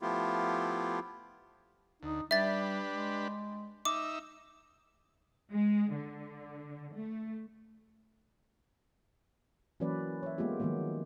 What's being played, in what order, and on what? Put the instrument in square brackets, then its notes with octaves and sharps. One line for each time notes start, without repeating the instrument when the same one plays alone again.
[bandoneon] F3 A3 B3 E4 F4 G4
[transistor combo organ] D2 [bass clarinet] D#4
[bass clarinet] G3 [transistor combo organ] D4 G4 B4 [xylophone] E5 A6
[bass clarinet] G#3
[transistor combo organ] D#4 E5 [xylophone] D6
[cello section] G#3
D3
A3
[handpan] E3 F#3 A#3 C#4 B4 D5
C#5 E5
G#3 A#3 B3 F4 G4
D#3 F3 F#3 G#3 A#3 B3